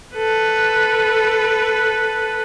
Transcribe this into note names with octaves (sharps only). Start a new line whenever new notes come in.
A4 B4